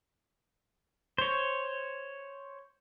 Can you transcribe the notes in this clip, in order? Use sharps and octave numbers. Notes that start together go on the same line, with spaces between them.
C5 C#5